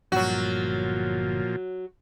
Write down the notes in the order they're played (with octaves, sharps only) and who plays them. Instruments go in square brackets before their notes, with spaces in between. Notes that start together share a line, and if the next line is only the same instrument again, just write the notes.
[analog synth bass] G1 [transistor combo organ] A#2 F3 [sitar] F#3 F#4